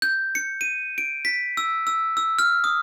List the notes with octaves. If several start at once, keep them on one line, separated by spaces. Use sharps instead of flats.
G6
C#7
D#7
D7
B6
E6
E6
E6
F6
D#6